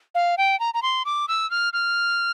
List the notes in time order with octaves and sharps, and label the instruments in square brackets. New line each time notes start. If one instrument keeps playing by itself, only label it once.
[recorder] F5
G5
A#5
A#5
C6
D6
E6
F6
F6